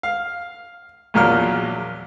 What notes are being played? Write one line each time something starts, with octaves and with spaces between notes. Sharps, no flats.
F5
A#1 E2 A#2 F#3 A#4 F6